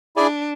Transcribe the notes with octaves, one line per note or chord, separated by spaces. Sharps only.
D4 E4 G#4 D5 G#5